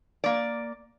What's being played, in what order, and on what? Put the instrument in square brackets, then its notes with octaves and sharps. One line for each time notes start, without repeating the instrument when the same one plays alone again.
[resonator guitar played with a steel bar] A#3 D5